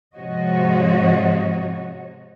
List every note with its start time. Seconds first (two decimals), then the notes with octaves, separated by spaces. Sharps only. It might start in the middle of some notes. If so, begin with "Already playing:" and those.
0.14 G#2 C3 F3 F#4 C#5 D#5